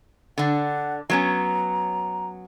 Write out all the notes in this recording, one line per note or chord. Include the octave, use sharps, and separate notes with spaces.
D3 D4 F#5
F#3 B3 C#4 A#5